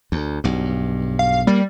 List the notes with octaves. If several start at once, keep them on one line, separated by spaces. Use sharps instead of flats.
D2
B1 G2
F5
G3 A#3